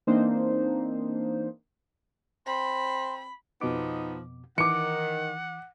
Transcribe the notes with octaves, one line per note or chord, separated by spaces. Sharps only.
E3 A#3 C4 D4 D#4 C5
C4 B5 C6
F2 B2 F3 B3 D#4 D6
D#3 E3 F#5 D6 C#7